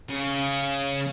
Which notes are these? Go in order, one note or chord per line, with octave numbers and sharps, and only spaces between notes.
C#3